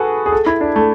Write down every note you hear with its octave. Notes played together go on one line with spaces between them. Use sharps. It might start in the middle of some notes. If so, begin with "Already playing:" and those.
Already playing: F#4 G#4 A4 B4
G#4
A4
E4
D4
A3